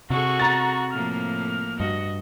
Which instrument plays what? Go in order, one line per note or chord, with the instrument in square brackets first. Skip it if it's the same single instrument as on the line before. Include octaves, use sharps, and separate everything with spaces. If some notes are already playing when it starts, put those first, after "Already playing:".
[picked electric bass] C3 [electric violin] F#4 C#6 [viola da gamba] G#4 A4
[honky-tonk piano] A#5 A6
[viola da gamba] A2 F3 A#3 [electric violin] F6
[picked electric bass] G2 [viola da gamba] F#4 [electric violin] D#5